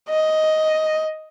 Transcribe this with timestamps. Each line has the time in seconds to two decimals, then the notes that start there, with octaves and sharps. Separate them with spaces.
0.10 D#5